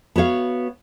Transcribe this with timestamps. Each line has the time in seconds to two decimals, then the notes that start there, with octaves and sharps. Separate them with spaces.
0.16 B3 F#4 C#5 F5